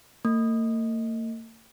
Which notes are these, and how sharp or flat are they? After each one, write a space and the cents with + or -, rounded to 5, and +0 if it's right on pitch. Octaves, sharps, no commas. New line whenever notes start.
A#3 -45